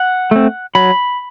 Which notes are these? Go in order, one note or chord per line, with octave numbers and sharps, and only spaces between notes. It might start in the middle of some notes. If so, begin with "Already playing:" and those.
Already playing: F#5
A3 C4
F#3 B5